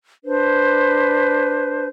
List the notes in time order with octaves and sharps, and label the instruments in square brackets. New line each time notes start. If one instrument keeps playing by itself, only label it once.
[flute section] D4 B4 C5